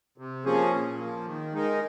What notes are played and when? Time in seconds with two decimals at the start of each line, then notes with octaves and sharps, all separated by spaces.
0.18 C3
0.45 F3 A#3 C#4 G#4
0.72 A#2
0.99 F3 A#3
1.26 D#3
1.53 G#3 D#4 A#4